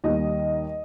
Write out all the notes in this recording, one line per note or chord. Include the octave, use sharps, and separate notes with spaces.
D#2 D#3 G3 A#3 D#5